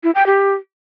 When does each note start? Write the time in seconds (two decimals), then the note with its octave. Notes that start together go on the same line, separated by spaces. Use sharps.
0.03 E4
0.15 G5
0.26 G4